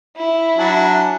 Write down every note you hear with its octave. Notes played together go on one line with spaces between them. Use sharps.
E4
F#3 D4 G#5